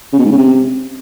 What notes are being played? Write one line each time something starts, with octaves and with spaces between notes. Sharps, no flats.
C#3
B2
G#2
C#3
C3